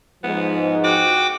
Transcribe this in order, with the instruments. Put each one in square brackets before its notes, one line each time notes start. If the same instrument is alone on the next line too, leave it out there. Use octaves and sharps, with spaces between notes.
[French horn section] G#2 F3 [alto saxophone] B3
[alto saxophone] F#4 [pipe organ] G5 D6